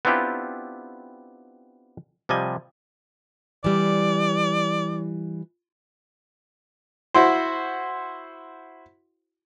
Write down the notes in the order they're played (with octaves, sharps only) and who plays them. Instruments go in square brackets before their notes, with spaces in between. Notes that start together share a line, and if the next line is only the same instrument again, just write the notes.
[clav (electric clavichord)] B3 C4 D4 E4 F4 G4
C3 F3 G3 D#5 G#5
[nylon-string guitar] E3 G3 [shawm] D5
[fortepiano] E4 F#4 C5